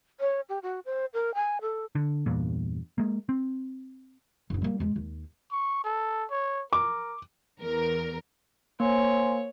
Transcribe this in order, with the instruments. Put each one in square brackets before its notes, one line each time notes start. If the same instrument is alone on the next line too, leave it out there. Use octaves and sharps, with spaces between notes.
[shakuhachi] C#5
G4
F#4
C5
A#4
G#5
A4
[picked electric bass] D3
E2 G2 A#2
G#3 A#3
C4
[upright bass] F#1 D3
G3 A#3
E2 G#3
D#2
[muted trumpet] C#6
A4
C#5
[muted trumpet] A#4 [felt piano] D6
[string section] E2 A#4
[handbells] A#3 [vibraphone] C5 G#5 C6 [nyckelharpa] C#5